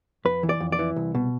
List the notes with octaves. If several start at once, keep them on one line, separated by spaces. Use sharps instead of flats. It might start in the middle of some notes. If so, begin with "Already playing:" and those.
F2 B4
E3
D5
F2
D5
E3
C2
B2